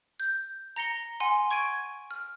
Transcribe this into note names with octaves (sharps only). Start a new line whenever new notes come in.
G6
A#5 A#6 C#7 G7
F#5 G#5 C6
C#6 G#6 D7 D#7
F6